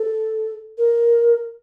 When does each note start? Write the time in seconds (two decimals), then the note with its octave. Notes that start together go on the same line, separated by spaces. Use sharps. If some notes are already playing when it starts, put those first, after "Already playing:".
Already playing: A4
0.78 A#4